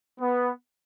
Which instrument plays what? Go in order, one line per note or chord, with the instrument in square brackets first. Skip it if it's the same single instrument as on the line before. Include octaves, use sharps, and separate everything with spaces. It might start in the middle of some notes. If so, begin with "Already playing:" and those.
[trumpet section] B3